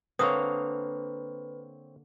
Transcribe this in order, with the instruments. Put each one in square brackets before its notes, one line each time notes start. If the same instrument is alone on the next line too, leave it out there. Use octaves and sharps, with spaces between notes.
[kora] D3 A#3 [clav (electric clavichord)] C4 C#5 [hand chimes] B4 [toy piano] D#6 E6